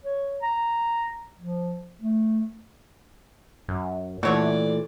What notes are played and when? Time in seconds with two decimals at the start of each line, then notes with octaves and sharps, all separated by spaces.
0.04 C#5
0.42 A#5
1.40 F3
2.01 A3
3.68 F#2
4.23 A#2 E3 A3 F#4 C#5 D5